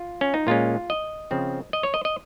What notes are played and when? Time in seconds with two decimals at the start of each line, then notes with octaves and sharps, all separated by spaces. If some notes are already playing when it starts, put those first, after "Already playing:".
Already playing: F4
0.21 C#4
0.34 D#4
0.47 A#2 G#3 C#4 F4
0.90 D#5
1.31 C#3 F3 C4
1.73 D#5
1.83 C#5
1.94 D#5
2.05 D#5